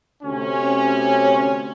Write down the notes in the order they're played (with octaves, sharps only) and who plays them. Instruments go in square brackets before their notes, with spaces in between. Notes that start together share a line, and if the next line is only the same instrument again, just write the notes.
[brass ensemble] D2 C3 C#4